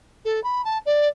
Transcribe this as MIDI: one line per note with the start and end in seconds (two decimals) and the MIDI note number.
0.24 0.42 69
0.43 0.64 83
0.64 0.78 81
0.85 1.08 74